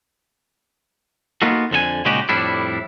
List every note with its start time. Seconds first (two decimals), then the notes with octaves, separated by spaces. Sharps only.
1.42 A#3 B3 D#4 F4 F#4 A4
1.71 F2 D3 A4 G#5
2.05 A#2 C#3 G#3 D#4 F#4 G4
2.29 F2 A2 G3 D4 E4